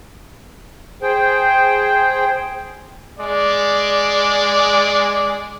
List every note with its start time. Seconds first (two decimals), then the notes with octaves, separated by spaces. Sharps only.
1.02 G#4 C5 G5
3.19 G#3 D5